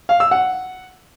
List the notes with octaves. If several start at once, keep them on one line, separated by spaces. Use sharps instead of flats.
F5
E6
F#5